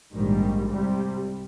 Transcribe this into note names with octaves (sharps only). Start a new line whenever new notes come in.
A#1 G#2 D#3 G3
C2 C3 G3